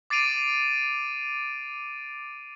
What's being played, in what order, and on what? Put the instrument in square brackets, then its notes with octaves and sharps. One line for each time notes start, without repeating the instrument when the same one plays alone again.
[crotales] D6 A6 C7 D7 D#7 F7